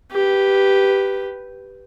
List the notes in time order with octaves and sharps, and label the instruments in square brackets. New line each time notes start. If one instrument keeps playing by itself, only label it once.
[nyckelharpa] G4 B4